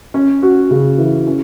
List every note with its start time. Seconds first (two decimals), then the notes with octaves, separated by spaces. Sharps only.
0.14 C#4
0.42 F#4
0.71 C#3
0.98 E3
1.27 C#4